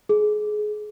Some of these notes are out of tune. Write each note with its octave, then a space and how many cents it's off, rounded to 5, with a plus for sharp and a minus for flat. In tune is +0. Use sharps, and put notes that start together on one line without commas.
G#4 +25